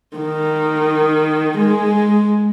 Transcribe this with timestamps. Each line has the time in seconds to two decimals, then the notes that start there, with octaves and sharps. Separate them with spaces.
0.17 D#3
1.58 G#3